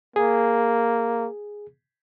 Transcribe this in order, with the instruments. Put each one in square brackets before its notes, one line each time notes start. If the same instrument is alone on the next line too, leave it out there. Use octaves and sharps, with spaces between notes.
[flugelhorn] A#3 [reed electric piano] G#4